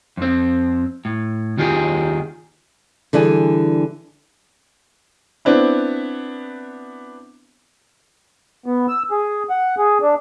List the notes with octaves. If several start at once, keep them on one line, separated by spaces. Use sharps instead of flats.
F2 C4
A2
D#2 D#3 F4 G4 G#4
D3 E3 G3 G#4
B3 C4 D4 E4
B3
E6
G#4
F#5
G#4
D4